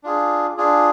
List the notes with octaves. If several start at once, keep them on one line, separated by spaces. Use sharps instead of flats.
D4 F4 G#4
D4 F4 G#4